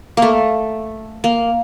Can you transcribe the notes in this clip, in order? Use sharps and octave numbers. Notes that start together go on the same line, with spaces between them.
A3 A#3
A#3